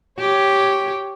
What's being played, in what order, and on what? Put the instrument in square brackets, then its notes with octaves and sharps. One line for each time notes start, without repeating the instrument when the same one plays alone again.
[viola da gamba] G4 C#5